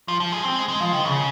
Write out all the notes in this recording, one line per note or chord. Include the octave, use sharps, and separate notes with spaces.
F3
F3
G#3
C4
G#3
G#3
F3
D#3
C#3